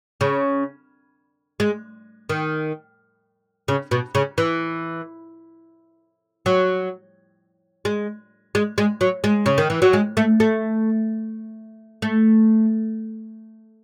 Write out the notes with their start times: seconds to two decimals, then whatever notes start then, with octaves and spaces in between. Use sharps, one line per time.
0.21 C#3
1.60 G#3
2.29 D#3
3.68 C#3
3.91 B2
4.15 C#3
4.38 E3
6.46 F#3
7.85 G#3
8.55 G#3
8.78 G#3
9.01 F#3
9.24 G#3
9.46 C#3
9.58 D#3
9.70 E3
9.82 F#3
9.93 G#3
10.17 A3
10.40 A3
12.02 A3